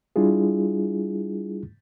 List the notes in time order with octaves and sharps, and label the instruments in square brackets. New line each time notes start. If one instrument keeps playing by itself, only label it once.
[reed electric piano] G3 D4 E4 F4 G#4